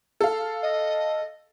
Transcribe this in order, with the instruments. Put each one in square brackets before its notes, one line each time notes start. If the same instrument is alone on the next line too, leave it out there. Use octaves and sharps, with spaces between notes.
[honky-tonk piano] A4 F5
[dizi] D#5